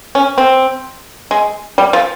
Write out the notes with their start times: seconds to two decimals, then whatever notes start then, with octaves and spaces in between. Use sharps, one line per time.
0.15 C#4
0.38 C4
1.31 G#3
1.78 G3
1.93 F3